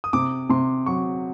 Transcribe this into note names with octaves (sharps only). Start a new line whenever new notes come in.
D#6
C3 D6
C3 C6
F#3 C#6